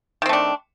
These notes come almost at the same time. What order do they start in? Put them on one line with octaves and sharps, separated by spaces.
D#3 C4 A3 D4